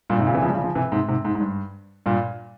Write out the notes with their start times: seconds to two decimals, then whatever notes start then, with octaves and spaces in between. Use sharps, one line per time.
0.10 G2 A#2
0.18 G#2 C3
0.27 A#2 C#3
0.34 C3 E3
0.42 C#3 F3
0.49 G3
0.53 C#3 F3
0.64 C#3 F3
0.75 C3 E3
0.92 G#2 C3
1.08 G#2 C3
1.25 G#2
1.35 G#2
1.40 G2
2.06 G2 A#2